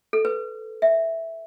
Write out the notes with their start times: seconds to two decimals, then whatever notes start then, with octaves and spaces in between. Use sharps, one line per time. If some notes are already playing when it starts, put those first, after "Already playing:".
0.13 A4
0.25 B4
0.82 E5